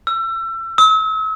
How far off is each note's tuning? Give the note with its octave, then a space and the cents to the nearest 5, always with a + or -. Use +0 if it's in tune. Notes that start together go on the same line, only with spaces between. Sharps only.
E6 +30
E6 -40